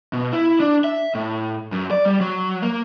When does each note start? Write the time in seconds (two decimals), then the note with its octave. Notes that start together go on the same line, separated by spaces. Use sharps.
0.13 B2
0.33 E4
0.60 D4
0.84 E5
1.15 A2
1.72 F#2
1.91 D5
2.06 G3
2.21 F#3
2.62 A#3